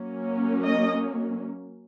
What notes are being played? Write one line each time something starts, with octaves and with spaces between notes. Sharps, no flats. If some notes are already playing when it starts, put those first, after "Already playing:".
Already playing: F#3 A#3 C#4
D#5